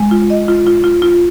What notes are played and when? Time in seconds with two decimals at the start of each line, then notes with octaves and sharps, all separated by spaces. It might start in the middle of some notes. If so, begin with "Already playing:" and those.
Already playing: G#3
0.11 F4
0.30 D#5
0.48 F4
0.66 F4
0.84 F4
1.02 F4